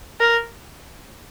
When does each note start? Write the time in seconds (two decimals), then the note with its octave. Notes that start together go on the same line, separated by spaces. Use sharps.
0.20 A#4